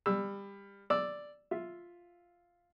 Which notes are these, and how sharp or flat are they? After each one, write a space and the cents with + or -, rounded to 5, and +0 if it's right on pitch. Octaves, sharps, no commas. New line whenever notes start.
G3 +25 E6 +0
D5 +0 E6 +0
F4 +0 E5 +5